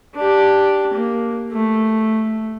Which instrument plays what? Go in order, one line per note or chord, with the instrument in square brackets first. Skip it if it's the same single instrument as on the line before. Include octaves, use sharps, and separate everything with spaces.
[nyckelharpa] D4 G4
A#3
A3